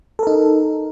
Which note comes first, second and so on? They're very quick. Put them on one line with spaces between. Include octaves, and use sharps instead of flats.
A4 A#4 D#4